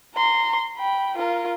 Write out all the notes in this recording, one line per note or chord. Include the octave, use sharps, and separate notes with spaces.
A#5 C6
G5 B5
F4 A#4